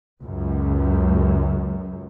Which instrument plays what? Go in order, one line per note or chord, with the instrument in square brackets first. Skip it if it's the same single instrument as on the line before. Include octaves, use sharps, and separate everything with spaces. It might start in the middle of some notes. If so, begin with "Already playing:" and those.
[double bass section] C#2 F#2